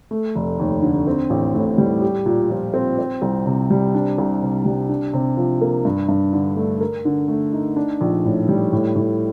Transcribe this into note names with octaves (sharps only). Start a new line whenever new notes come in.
A3
F1
D#2
D3
C4
A1
A2
G3
G4
A#2
F3
C4
C4
C2
C3
G3
D4
C2
C3
G3
D4
C3
F3
A#3
G2
G2
D3
A3
A#4
D3
A3
D#4
D4
A#1
A2
G3
A2
A2